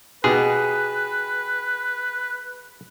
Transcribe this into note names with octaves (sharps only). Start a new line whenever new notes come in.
B2 D#4 G4 G#4 B4